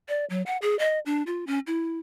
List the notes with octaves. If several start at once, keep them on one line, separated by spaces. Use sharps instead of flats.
D5
F#3
F#5
G#4
D#5
D4
F4
C#4
E4